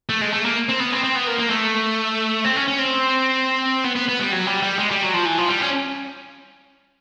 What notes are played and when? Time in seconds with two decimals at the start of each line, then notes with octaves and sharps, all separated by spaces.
0.09 A3
0.21 G#3
0.33 A3
0.45 A#3
0.69 C4
0.80 B3
0.92 C4
1.03 C4
1.15 B3
1.27 A#3
1.39 A#3
1.50 A3
2.45 C4
2.56 C#4
2.68 C#4
2.79 C4
3.84 B3
3.96 B3
4.08 B3
4.20 G3
4.32 F#3
4.47 G3
4.63 G3
4.79 G#3
4.91 G3
5.02 F#3
5.14 F3
5.25 E3
5.37 F3
5.48 G3
5.61 C#4